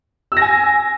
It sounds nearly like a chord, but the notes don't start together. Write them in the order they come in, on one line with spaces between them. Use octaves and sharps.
E6 A#6 G#5